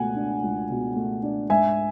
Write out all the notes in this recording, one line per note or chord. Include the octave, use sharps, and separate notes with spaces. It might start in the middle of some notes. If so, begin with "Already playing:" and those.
Already playing: C#2 B2 A3 F#5 G#5
D4
C#2
B2
A3
D4
G#2 E5 G#5